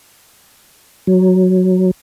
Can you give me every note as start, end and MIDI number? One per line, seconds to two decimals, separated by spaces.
1.07 1.91 54